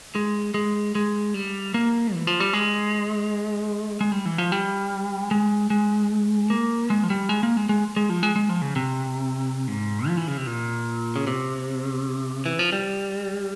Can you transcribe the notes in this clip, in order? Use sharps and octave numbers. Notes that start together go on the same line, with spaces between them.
G#3
G#3
G#3
G3
A#3
E3
F3
G3
G#3
G#3
G3
E3
F3
G3
G#3
G#3
A#3
G#3
F3
G3
G#3
A#3
G#3
G#3
G#3
F3
G#3
G#3
F3
C#3
C3
G#2
F3
E3
C#3
C3
A#2
C#3
C3
E3
F3
G3